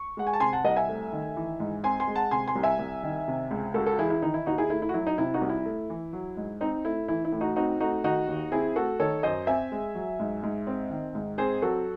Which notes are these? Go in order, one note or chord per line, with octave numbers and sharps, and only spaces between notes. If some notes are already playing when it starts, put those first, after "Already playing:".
Already playing: C#6
G#3 F#5
G#5
A5
C3 G#5 C6
F#5 A5
C2 D#5 F#5
E5 G#5
A3
D#3
E3
G#2
C4 G#5 C6
G#5 C6
G#3
F#5 A5
C3 G#5 C6
G#5 C6
C2
E5 G#5
C2
D#3
C3
C#2
C#2 F#4 A4
F#4 A4
E3 E4 G#4
E4
D#3 D#4
E4
D#2 D#4 F#4
E4 G#4
A3 E4
E4
F#4
F#3 E4
D#4
C3 E4
D#4 F#4
C2
E4
A3
E3
F#3
G#2
C4 D#4
A3 E4
E3 E4
E4
A2
D#4 F#4
C4 D#4 F#4
A3 D#4 F#4
D#3 D#4 F#4
D#2
C4 E4 G#4
A3 F#4 A4
D#3 A4 C#5
F#2 C5 D#5
C4 E5 G#5
G#3
F#3
G#2
G#2
C4
D#3
G#2
C4 G#4 C5
F#3 F#4 A4